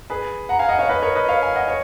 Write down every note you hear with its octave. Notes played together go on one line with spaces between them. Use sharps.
G#4 B4
F#5 A#5
F5 G#5
D#5 F#5
C#5 F5
B4 D#5
A#4 C#5
B4 D#5
C#5 F5
F5 G#5
D#5 F#5
C#5